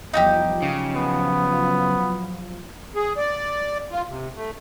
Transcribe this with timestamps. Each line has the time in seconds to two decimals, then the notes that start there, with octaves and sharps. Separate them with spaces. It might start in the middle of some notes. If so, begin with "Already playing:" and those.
0.13 E2 F3 G3 D#4 F#4 G4
0.62 C#3 F3 F#3
0.95 B3
2.96 G#4
3.17 D5
3.91 F4
4.07 C3
4.35 A3